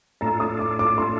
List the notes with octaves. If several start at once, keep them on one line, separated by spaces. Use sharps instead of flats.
A2 A3 D4 F4 A4 A#5
D#6
D6
D6
C6